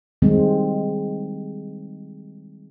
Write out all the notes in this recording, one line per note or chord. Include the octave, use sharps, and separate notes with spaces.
D#3 G3 G#3 C4